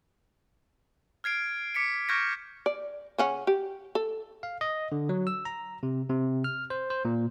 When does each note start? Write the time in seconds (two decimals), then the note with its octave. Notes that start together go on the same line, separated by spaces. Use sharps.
1.24 F6 G#6 C7 D7
1.75 D6 B6 C#7 D7
2.08 C#6 F6 G6 G#6 A#6 D7
2.66 D5
3.18 C#3 C#4 F#5
3.47 G4
3.95 A4
4.43 F5
4.61 D#5
4.92 D3
5.09 F#3
5.27 E6
5.45 A#5
5.83 C3
6.09 C3
6.44 F6
6.70 C5
6.90 C5
7.05 A#2